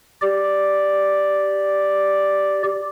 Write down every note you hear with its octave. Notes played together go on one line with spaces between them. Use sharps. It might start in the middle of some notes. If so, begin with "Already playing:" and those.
G4 D5